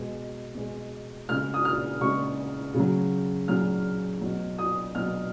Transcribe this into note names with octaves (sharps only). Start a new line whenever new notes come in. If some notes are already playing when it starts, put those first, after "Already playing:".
Already playing: B2 G#3
B2 G#3
C#3 G#3 F6
D#6
F6
C#3 G#3 C#6
C#3 F#3
C#3 F#3 F6
B2 F#3
D#6
B2 F#3 F6